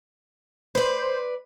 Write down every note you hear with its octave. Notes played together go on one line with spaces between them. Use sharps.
B4 C5 D5